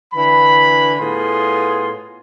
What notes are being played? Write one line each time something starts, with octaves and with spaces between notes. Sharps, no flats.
D3 E3 B5
A2 B3 F4 G#4 C6